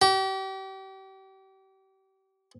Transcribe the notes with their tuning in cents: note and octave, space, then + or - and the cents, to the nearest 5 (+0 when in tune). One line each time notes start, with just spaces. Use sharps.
G4 -35